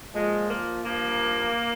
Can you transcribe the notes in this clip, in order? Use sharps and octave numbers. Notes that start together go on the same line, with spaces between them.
A#2 F3 G#3
A#3
G2 F3 A#3